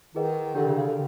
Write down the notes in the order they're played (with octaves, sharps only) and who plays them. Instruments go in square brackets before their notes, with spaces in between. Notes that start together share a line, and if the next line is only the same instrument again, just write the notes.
[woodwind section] D#3 [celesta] E4 G#4 B4 D#5 F#5
[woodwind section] D3 [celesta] D4 G4 A#4 D5
[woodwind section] C#3
C#3
D3